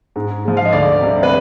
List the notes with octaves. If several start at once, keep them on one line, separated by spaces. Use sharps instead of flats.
G#2
F3 G#3
F5
D#5
D2 D5
C3 G3
B4